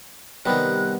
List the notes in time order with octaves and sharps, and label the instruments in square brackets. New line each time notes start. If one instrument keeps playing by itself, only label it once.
[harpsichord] C3 D#3 [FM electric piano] G3 B3 [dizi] F#6